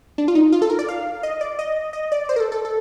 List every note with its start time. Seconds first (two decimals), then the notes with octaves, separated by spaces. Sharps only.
0.18 D4
0.28 F4
0.35 D#4
0.52 F4
0.62 A4
0.70 A#4
0.79 D5
0.89 F5
1.23 D#5
1.41 D5
1.59 D#5
1.93 D#5
2.12 D5
2.29 C5
2.36 A#4
2.40 A4
2.52 A4
2.65 A4